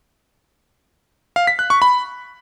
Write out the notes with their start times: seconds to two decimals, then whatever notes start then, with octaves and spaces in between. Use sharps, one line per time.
1.36 F5
1.47 B6
1.59 F#6
1.70 C#6
1.82 B5